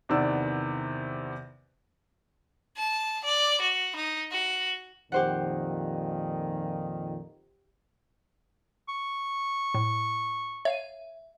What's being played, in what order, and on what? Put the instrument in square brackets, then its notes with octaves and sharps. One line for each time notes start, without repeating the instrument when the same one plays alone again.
[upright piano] E2 C3 D#3 B3 D5 E6
[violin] A5
D5
F#4
D#4
F#4
[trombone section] F2 A#2 D#3 [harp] G4 C5 F#5
[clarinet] C#6
[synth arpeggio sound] A2
[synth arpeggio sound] C#5 F5 D#7 [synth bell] E5